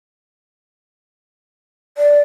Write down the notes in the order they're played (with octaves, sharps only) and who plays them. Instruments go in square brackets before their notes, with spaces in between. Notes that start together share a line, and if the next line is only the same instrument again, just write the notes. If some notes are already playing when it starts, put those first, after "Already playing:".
[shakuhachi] D5